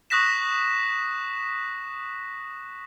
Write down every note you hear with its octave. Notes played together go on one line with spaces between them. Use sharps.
C#6 D#6 F#6 A#6 B6 E7